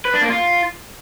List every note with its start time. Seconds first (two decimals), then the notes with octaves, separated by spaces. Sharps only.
0.05 B4
0.13 D4
0.22 A#3
0.30 F4